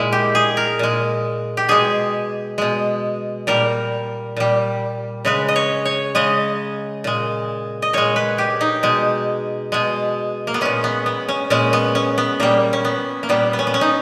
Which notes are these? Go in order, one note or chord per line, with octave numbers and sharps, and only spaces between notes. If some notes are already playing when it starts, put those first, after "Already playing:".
Already playing: A#2 G#3 E4
G4
G#4
A#4
A#2 G#3
G4
B2 G#3 G#4
B2 G#3
A#2 G3 A#4
A#2 G3
C#3 G#3 B4
D#5
C#5
C#5
C#3 G#3 D#5
A#2 G#3
D#5
A#2 G#3 C#5
B4
G4
D#4
B2 G#3
B2 G#3
A#3
B3
A#2 G#3 C#4
B3
B3
C#4
A#2 G#3 C#4
B3
C#4
B3
A#2 G3 A#3
C#4
B3
A#3
A#2 G3 B3
B3
C#4
B3
C#4
D#4